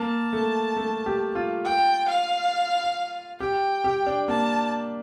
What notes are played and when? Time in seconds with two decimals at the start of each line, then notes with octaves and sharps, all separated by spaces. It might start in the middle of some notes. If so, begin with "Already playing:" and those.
Already playing: A#3 A5
0.33 A3
0.76 A3
1.06 G4
1.35 F4
1.65 G5
2.08 F5
3.40 G4 G5
3.84 G4
4.07 D4
4.28 A#3 A5